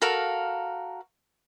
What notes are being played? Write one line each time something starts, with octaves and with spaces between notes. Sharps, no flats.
F#4 A4 A#4 F5